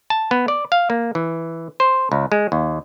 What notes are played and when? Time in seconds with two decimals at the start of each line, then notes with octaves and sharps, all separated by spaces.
0.10 A5
0.31 B3
0.48 D5
0.72 F5
0.90 A#3
1.15 E3
1.80 C5
2.12 C#2
2.32 G#3
2.52 D#2